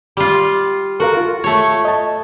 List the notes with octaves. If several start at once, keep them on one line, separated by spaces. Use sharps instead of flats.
G3 F4
F#4 A4 A#4 F5
F4
A3 C#5
D#5 A5